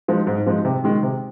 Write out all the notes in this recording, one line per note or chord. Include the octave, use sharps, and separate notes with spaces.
F3 G#3 D#4
G#2
F3 G#3 D#4
C3
D#3 G#3
C3